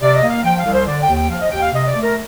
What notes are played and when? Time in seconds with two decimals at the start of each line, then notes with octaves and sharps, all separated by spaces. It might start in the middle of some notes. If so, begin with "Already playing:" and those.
0.02 C3 D5
0.16 D#5
0.23 A#3
0.30 F5
0.44 F3 G5
0.59 F5
0.66 C2
0.73 C5
0.87 D3 D5
1.02 G5
1.09 D#2
1.16 G5
1.30 F3 F5
1.41 D#5
1.52 D#2 G5
1.62 F5
1.73 C3 D#5
1.88 D5
1.95 A3
2.02 A#4